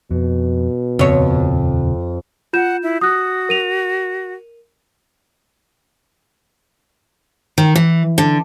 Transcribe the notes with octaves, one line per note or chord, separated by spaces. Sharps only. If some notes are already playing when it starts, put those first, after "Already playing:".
F2 B2
D#1 F2 C#3 C4 C#5
F4 F#5 G6 E7
E4
F#4 D#6 F#6
A#4 D#7 F7
D#3
E3
D3